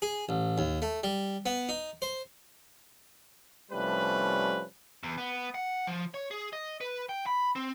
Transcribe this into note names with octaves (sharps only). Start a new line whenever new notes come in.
G#4
A1
D#2
A3
G3
B3
D#4
C5
C2 F3 G3 A3 C#4 B4
E2
B3
F#5
F3
C#5
G#4
D#5
B4
G5
B5
C4